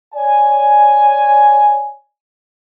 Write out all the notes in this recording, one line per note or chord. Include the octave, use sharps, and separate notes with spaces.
C#5 D5 G#5